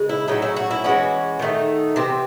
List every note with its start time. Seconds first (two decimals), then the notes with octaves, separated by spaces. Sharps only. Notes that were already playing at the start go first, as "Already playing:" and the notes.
Already playing: C#3 G#3
0.09 E4
0.28 A2 F#3 C#4 D#4
0.42 E4
0.57 F#4
0.71 E4
0.84 E3 G#3 C#4 F#4
1.39 D#3 A3 D#4
1.96 C3 E3 C4